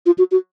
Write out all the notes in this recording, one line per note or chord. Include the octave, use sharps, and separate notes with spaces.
F4
F#4
F#4